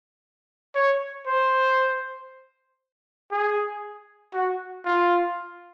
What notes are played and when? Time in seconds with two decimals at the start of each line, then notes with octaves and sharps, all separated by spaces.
0.75 C#5
1.26 C5
3.31 G#4
4.33 F#4
4.85 F4